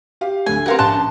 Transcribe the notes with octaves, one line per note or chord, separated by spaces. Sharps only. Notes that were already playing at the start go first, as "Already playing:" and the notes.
G4 F5
D2 A3 G#5
C4 G4 A#4 B4 F5 F#5
A#1 C#4 A5 C6 F#6